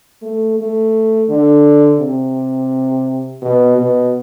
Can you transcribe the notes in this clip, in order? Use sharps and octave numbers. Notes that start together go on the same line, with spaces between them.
A3
A3
D3
C3
B2
B2